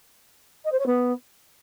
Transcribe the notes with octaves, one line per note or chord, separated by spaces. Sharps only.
D#5
C5
C#5
B3